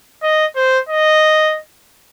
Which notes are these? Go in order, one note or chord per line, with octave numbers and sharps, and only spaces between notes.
D#5
C5
D#5